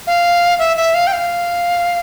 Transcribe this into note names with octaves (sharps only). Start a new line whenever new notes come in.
F5
E5
E5
F5
G5
F5